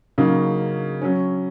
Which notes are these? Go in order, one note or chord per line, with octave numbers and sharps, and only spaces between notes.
C#3 F#3 A#3 D#4
F#3 C#4